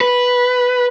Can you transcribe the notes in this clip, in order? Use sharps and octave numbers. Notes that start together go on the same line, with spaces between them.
B4